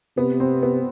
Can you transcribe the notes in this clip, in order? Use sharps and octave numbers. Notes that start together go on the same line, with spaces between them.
C3 B3
C4
B3